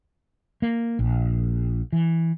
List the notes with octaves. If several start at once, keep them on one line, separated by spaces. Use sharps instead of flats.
A#3
A#1
E3